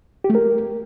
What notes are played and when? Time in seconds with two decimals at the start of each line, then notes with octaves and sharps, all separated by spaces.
0.24 G4
0.30 A3
0.35 A#4